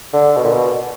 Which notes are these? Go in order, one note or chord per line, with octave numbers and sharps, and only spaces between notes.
D3
B2
A#2
B2